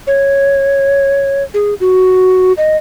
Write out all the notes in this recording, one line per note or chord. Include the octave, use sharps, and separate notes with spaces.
C#5
G#4
F#4
D#5